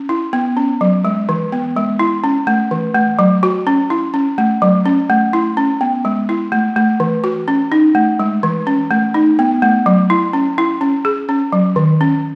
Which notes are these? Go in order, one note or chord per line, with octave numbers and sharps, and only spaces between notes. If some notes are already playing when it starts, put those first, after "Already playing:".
Already playing: C#4
E4
B3
C#4
F#3
G#3
E3
B3
G#3
E4
C#4
A3
E3
A3
F#3
F#4
C#4
E4
C#4
A3
F#3
C#4
A3
E4
C#4
B3
G#3
E4
A3
A3
E3
F#4
C#4
D#4
A3
G#3
E3
C#4
A3
D#4
B3
A3
F#3
E4
C#4
E4
C#4
G#4
C#4
F#3
D#3
C#4